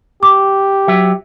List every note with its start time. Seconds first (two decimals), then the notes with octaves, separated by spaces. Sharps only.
0.23 G4 D6
0.88 F#3 E5